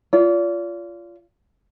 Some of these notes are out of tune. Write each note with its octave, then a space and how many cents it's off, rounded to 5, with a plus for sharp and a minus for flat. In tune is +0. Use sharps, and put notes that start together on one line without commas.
F4 -15 D5 -40